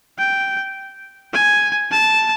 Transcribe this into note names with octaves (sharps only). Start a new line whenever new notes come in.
G5
G#5
A5